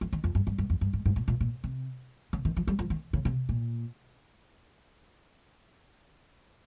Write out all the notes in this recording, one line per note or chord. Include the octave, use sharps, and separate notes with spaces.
F3
D#3
F2
G2
G2
G2
F2
G2
G#2
G#2
A#2
A#2
A#2
C3
C#3
D#3
F3
G3
F3
D#3
C#3
C3
A#2